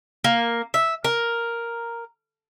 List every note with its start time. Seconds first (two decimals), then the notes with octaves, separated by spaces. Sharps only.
0.24 A#3
0.74 E5
1.04 A#4